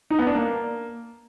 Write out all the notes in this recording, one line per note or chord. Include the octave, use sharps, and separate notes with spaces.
D#4
B3
D4
A#3